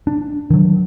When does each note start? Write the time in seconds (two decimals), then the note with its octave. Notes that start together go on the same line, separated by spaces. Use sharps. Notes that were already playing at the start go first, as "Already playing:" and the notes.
0.07 D4
0.50 D#3 F#3